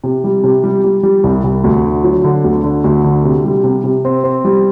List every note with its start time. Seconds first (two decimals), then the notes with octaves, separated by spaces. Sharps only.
0.04 C3
0.24 G3
0.44 C3
0.64 G3
0.84 G3
1.03 G3
1.24 C2
1.44 C2
1.64 D2
1.85 D3
2.04 F#3
2.24 D3
2.44 D2
2.64 D3
2.84 D2
3.04 D3
3.24 C3
3.44 G3
3.64 C3
3.84 C3
4.05 C4
4.24 C4
4.45 G3